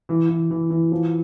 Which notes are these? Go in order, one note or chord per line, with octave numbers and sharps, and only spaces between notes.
E3
E3
E3
E3
F3